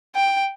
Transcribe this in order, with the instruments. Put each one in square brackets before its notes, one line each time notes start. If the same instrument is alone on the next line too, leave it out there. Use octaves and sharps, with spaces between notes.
[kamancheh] G5